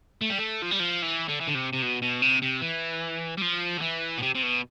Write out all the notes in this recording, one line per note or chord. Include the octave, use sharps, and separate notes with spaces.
A3
G3
A3
F3
G3
F3
E3
D3
E3
D3
C3
C3
B2
B2
C3
C3
E3
G3
F3
D3
E3
B2
C3
C3
B2